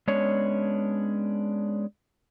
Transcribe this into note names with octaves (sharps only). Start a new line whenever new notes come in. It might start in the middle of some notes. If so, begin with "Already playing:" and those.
G#3 B3 C#4 D4 C#5